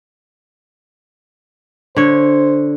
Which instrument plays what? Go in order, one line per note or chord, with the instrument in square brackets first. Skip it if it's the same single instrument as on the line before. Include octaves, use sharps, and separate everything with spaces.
[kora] D3 C#5 [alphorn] C5